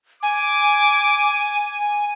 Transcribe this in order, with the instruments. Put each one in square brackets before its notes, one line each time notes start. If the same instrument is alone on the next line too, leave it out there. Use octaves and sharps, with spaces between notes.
[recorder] G#5 [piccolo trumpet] D6